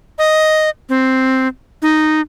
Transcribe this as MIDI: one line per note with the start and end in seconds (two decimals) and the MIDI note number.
0.19 0.70 75
0.89 1.47 60
1.82 2.21 63